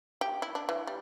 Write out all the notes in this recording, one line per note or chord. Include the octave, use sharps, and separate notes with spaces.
G4
E4
D4
E3
G3